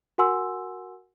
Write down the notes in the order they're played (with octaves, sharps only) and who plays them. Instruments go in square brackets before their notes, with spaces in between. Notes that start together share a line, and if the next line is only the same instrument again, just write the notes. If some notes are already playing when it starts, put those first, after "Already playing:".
[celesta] F#4 A#4 F#5 G#5 C6 E6